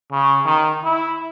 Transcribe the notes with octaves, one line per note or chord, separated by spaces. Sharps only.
C#3
D#3
E4